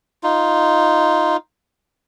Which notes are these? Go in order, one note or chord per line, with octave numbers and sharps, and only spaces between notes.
D#4 F4